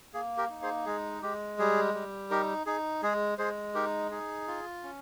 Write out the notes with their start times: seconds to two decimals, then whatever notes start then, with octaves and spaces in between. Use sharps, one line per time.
0.14 A#3 G#4
0.37 G4 A#4
0.50 D#4
0.62 G#4 C5
0.86 G#3 G#4
1.22 G#3 G4
1.59 G3 G#4
1.94 G3
2.31 D#4 G4 A#4
2.66 D#4 G#4
3.02 G#3 G#4
3.38 G#3 G#4 C5
3.74 D#4 G4 A#4
4.11 D#4 G#4
4.48 F4
4.83 C#4